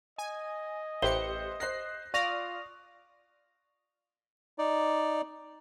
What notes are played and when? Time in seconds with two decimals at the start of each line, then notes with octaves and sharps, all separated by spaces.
0.18 D#5 G#5
1.02 A1 G4 B4 C5 E5 C#7 G7
1.60 C5 F#6 A#6 C7
2.14 F4 D5 F5 C#6 D#6 F6 A#6 F7
4.58 D#4 D5